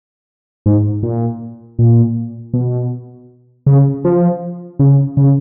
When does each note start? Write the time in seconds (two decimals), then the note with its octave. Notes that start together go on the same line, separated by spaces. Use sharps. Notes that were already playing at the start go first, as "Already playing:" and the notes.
0.66 G#2
1.03 A#2
1.79 A#2
2.54 B2
3.66 C#3
4.05 F3
4.79 C#3
5.17 C#3